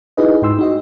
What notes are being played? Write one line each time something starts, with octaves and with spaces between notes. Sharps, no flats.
D#4 E4 F#4 G#4 B4 D#5
G#2 G5 C6 E6
D#4 F#4 D#5